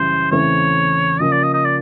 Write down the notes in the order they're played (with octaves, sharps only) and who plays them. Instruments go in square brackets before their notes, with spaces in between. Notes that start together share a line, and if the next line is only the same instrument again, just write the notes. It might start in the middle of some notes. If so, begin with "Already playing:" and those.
Already playing: [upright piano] F#2 C#3 E3 G3 [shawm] C5
[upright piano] E2 C#3 E3 A3 C4 [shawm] C#5
[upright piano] C#3 F3 A#3 [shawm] D#5
[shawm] D5
D#5
D#5
D5